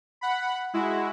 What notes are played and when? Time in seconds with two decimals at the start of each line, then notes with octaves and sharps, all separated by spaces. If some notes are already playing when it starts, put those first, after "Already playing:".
0.21 F#5 B5
0.73 G#3 E4 F#4